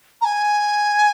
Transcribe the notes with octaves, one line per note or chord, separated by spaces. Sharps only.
A#5
G#5